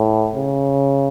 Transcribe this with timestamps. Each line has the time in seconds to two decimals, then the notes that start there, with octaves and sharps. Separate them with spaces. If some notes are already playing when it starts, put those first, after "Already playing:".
Already playing: A2
0.36 C#3